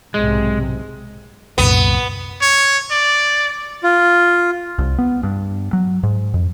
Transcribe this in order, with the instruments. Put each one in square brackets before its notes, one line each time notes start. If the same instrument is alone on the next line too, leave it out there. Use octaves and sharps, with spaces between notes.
[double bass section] B1 G#2 C3 [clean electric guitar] G#3
[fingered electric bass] C2 F#2 A#2 [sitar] B3
[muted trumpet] C#5
D5
[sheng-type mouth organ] F4
[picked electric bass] C2
B3
G2
F#3
G#2
F2